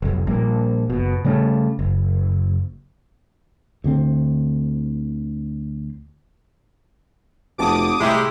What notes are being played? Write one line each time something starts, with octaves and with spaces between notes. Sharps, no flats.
F1 B1
A#1 G3 A#3
F#1 B2
C#3 G3 A3 C#4
F#1
D2 D3 C4
F1 B2 A5 D6 D#6
C2 A2 G#3 E4 G4